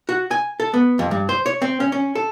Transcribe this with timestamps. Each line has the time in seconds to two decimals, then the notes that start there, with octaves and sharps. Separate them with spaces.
0.09 F#4
0.31 G#5
0.60 A4
0.74 B3
0.99 F2
1.11 G2
1.29 C5
1.46 C#5
1.62 C4
1.80 C#4
1.92 C#4
2.15 A4